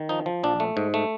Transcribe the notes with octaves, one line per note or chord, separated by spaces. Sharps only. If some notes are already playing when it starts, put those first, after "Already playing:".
Already playing: D#3
F3 D#4
F3
A#1 D4
A3
G#2
A3